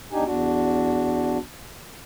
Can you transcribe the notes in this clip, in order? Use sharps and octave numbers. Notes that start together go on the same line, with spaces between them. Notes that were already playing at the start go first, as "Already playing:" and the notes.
E2 D4 D#4 G4 G#5
E2 D4 F#4